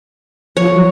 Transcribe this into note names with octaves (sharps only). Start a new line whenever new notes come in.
F3 C#5
F#3